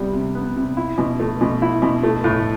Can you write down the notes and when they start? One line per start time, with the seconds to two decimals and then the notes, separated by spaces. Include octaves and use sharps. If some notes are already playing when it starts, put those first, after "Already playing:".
Already playing: C3 G3 B3
0.13 C3
0.35 B3
0.56 C3
0.77 E4
0.98 B2
1.20 A3
1.41 B2
1.62 E4
1.82 B2
2.03 A3
2.24 A2